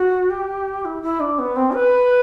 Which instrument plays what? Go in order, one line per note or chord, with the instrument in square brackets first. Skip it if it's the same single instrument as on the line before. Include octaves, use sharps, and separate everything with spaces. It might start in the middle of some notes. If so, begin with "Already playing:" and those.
Already playing: [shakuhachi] F#4
G4
E4
E4
D4
B3
C4
B4